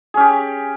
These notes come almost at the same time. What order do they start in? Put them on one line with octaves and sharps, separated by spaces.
G#4 C#4 G4